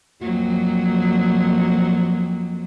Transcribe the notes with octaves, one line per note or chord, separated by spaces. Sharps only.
F2 F#3 A#3